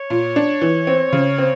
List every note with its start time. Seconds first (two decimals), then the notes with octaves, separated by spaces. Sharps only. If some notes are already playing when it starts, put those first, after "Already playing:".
Already playing: C#5
0.10 A#2
0.36 D4
0.61 E3
0.87 C4
1.12 C#3
1.38 C4